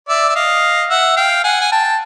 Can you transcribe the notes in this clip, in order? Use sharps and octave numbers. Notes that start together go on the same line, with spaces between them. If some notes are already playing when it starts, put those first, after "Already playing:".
D5 E5
E5
D#5 F5
E5 F#5
F5 G5
F#5 G#5
G#5
G5 A5